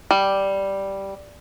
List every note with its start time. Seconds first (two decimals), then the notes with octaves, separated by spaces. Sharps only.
0.11 G3